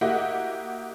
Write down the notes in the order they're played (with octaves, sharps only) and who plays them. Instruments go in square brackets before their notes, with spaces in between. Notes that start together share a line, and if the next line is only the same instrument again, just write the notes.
[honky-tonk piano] A#3 E4 F#4 G4 D#5 F#5